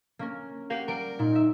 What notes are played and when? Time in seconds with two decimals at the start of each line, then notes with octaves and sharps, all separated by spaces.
0.19 A#3 C#4 A#4
0.70 A#3 G4 F#5
0.88 G3 A#4 D7
1.19 A#2 D#4
1.35 E5